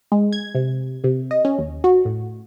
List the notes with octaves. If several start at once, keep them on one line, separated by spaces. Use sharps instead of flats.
G#3
G#6
C3
C3
D#5
C#4
D#2
F#4
A2